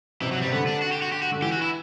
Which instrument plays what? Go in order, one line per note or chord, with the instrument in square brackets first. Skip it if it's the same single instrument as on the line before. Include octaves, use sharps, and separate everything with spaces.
[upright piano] C3 [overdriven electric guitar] E3
[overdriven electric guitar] F#3
G3
[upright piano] C3
[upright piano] D3 [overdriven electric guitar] B3
[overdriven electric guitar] D4
F#4
G4
F#4
G4
F#4
[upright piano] D3
[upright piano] E3 [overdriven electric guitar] G4
[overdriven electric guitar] F#4
E4